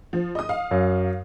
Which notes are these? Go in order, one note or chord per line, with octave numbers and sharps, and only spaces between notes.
F3
D#5 D#6
F5
F#2